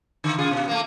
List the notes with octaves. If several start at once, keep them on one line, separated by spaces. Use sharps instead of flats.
D3
C#3 F4 G#4
B2
A3 A#3